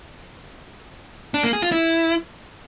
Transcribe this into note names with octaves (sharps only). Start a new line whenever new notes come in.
D4
A#3
G#4
F4
E4